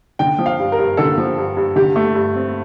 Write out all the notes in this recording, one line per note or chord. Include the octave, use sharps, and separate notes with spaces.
D3 G5
F3
F5
G2
A#4
G2
D3 A4
F3
G2
G2
D3 G4
A3
G2
C4